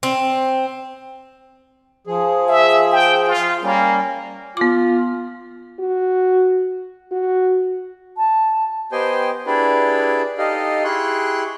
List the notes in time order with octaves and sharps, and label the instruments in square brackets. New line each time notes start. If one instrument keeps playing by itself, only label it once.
[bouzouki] C4
[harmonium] F3 G#4
[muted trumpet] E5
G5
F4
[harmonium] G3 C#4 [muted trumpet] A#3
[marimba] B3 D6 [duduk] F4
[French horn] F#4
F#4
[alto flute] A5
[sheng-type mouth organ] B3 G4 C5 D#5 G5 G#5
D4 E4 G4 G#4 B4 D5
D#4 G4 A4 D#5 F5
E4 G4 G#4 C6 C#6 F#6